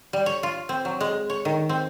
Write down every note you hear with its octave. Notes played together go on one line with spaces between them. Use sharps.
G3
C#5
F4
C4
F#3
G#3
C#5
D#3
C4